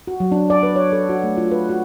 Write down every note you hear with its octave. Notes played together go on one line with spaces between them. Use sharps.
F#4
F#3
D4
D5
B4
C#5
A4
F#4
A3
F4
B4
F#4